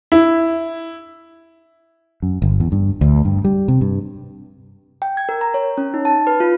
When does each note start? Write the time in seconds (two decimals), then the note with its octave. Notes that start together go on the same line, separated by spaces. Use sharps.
0.12 E4
2.22 F#2
2.42 G1
2.60 E2
2.72 G2
3.01 D2
3.25 G2
3.45 G3
3.68 C3
3.81 G2
5.02 G5
5.17 G#6
5.29 A#4
5.41 A#5
5.54 C#5
5.78 C#4
5.94 D#4
6.05 A5
6.27 B4
6.40 F4